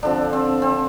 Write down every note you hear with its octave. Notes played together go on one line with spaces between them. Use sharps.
D3 F3 C4 D4
C4
C4